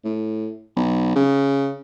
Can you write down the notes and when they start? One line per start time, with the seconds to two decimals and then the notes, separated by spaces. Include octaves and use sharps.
0.05 A2
0.76 B1
1.16 C#3